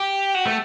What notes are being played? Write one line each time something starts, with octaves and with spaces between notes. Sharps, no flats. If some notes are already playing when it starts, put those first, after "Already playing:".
Already playing: G4
F#4
A3